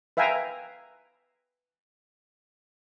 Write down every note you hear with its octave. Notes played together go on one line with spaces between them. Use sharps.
B4 E5 F5 G5 G#5 A#5